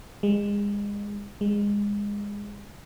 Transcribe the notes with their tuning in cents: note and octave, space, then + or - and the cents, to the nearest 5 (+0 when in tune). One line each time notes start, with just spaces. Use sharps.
G#3 -30
G#3 -25